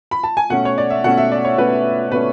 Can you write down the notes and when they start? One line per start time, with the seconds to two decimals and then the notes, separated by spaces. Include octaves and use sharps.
0.11 B5
0.24 A5
0.37 G#5
0.50 B2 A3 C#4 F#5
0.65 C#5
0.78 D5
0.90 E5
1.04 B2 A3 C#4 F#5
1.18 E5
1.32 D5
1.45 C#5
1.58 B2 A3 C#4 B4
2.12 B2 A3 C#4 B4